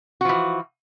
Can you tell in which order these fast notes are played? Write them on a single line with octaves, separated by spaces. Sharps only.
F#4 F3 E3